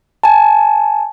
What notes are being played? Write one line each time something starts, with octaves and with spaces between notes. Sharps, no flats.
G#5 A5